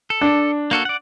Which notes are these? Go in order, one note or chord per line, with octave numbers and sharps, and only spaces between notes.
A4
D4
A#3 F#4 A4
D5 F#5